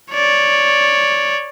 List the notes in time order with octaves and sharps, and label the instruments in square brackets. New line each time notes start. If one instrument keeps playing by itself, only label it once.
[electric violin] C#5 D5